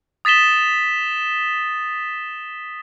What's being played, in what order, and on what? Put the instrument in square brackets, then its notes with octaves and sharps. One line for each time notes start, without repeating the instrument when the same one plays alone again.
[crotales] D#6 A6 B6 E7 G7